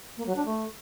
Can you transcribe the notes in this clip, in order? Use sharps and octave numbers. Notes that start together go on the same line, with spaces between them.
A#3
F#3
D4
A3